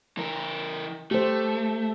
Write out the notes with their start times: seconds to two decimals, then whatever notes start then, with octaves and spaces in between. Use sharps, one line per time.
0.17 E3 A#4
1.11 A3 G4 C5